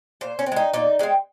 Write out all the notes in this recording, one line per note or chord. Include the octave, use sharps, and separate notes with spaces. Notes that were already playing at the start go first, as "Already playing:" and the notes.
A#2 C5
C#4
C4
G#3 D#4
A#2 D#4
G#3 C4 D#4